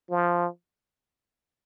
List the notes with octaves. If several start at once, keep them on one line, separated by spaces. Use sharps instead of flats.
F3